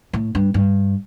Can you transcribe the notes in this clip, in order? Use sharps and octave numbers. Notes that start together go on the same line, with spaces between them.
A2
G2
G2